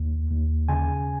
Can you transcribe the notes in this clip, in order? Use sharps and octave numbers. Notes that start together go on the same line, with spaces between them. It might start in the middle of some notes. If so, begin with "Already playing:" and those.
Already playing: D#2
D#2
C#3 G#5